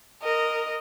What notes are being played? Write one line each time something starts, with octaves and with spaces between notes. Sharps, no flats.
A#4 D#5